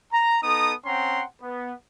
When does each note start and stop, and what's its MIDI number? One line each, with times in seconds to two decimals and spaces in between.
0.12 0.37 82
0.43 0.73 59
0.43 0.73 63
0.43 0.73 69
0.43 0.73 82
0.43 0.73 87
0.86 1.23 60
0.86 1.23 61
0.86 1.23 78
0.86 1.23 79
0.86 1.23 82
0.86 1.23 84
1.42 1.73 59